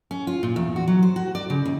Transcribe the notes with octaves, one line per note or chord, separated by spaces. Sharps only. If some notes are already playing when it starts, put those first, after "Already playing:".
C#4
F4
A#2
E2
F#4
F#3
C5
F#4
D5
C#3
D#2